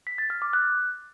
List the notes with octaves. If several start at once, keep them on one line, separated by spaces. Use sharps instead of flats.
B6
A6
F6
D6
F#6